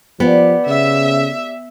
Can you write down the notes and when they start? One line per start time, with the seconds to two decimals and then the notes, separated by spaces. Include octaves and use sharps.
0.20 F3 B3 G4 D5
0.68 C#3 E5